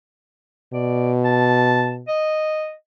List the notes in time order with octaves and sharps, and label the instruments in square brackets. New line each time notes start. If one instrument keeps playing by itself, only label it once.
[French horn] B2 [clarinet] D5
[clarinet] A5
D#5